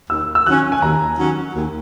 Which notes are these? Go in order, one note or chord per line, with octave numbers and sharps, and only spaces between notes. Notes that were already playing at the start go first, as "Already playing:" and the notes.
D#2 E6
E6
D#3 F#3 C#4 F#6
G#5
D#2 A#5
D#3 F#3 C#4
D#2